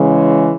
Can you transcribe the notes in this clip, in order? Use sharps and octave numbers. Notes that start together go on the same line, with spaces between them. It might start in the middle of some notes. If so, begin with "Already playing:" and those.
Already playing: C#3 E3 G#3